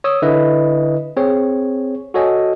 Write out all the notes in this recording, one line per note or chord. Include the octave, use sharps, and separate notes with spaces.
C#5 D#6 E6
D3 E4 B4 D#5
C4 G#4 C#5
F#4 A4 C#5 D#5 G#5